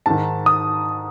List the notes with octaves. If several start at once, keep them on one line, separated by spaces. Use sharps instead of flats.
G#2 D#3 A5
D#6